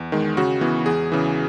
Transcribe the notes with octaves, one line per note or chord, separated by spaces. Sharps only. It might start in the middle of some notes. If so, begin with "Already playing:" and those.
Already playing: E2
D#3 G#3
C#3 F#4
E3 B3
E2 G#4
C#3 E3